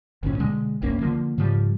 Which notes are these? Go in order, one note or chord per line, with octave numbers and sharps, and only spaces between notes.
G#1 D2 A#2 C#4
B2 D3 G#3
F#1 C2 A#3 C#4
D3 E3 F3 A#3
G#2 C#3 F3 G3